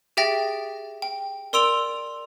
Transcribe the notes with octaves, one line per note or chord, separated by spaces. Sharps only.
G4 G#4 E5 G5 A6 A#6
G5
A#4 D5 C6 E6 D7 F7